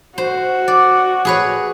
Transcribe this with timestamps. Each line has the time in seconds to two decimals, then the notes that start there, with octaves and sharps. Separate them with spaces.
0.18 F#4 C5
0.68 D5
1.25 G#4 B4 C#5